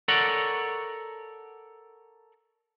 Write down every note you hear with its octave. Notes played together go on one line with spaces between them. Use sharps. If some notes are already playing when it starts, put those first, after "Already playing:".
A4 A#4 C#5 D5 F#5